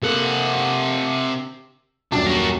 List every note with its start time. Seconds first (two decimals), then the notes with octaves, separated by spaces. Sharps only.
0.02 C3 A#3 A4 F#5
2.12 D#1 F#2 D4 A5
2.26 F#4 A#4